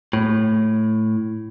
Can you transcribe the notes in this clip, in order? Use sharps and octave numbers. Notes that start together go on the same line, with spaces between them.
A2